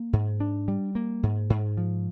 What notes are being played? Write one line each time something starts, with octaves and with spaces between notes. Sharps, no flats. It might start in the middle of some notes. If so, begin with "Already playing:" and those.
Already playing: A#3
G#2
D4
G3
A#3
G#2
G#2
F3